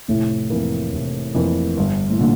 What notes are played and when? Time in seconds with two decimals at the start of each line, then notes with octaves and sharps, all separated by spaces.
0.08 F1 A2
0.50 F2 E3 A#3
0.93 F1
1.34 F2 E3 A#3
1.77 G1 G2
2.10 A2
2.19 A#2 D3